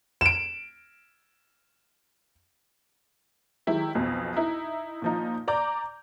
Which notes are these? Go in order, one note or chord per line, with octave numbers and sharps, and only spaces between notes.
D7 E7
D#3 F#3 G#3 E4 G4
B1 F2 B2
D#4 E4
A#2 F3 D#4
D5 A#5 D6 G6